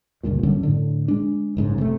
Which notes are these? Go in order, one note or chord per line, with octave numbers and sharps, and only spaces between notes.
G1 C#2 G2 A#2
F#2 D3 G3 C#4
A2 D3
G#3 D4
F#1 G#2 C#3
C3 A3